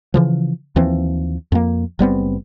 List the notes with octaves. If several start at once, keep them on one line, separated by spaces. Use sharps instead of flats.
C#3 E3 F3
D#2 E3 F3 C4
F2 A#3
F#1 G3 B3 C4